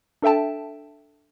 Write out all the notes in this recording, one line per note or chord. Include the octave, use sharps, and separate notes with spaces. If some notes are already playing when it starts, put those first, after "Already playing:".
D4 A4 E5 G5 A5